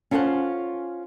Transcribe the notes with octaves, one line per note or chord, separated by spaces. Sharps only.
C#4 F4 A4 C5 F5 F#5